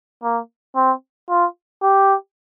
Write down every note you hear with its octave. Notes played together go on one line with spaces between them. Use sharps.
A#3
C4
F4
G4